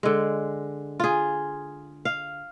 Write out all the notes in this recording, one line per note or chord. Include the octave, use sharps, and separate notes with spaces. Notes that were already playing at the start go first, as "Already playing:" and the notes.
D3 G#3
F4 G#4
F5